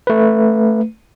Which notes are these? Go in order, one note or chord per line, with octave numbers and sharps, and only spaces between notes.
A3 B4